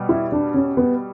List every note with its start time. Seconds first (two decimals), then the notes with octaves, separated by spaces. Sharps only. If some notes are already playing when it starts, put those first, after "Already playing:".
Already playing: B2 G3
0.09 E4
0.32 D4
0.54 C#4
0.77 B3